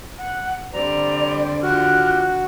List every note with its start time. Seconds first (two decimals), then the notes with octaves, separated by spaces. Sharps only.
0.18 F#5
0.73 D3 G3 C4 G4 D5 A#5
1.63 F3 F#4 G4 F6 F#6